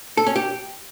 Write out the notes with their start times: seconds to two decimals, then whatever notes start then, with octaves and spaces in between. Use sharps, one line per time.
0.17 A4
0.26 C#4
0.36 G4